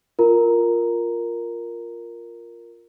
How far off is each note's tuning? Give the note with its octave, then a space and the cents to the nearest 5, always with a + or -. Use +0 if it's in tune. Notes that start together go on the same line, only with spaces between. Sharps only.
F4 +0 A#4 +0 A#5 +0